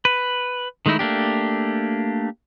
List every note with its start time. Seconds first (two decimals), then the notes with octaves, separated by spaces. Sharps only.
0.05 B4
0.86 D#3 G#3 A3 D#4 E4
0.99 A3 A#3 D4 G4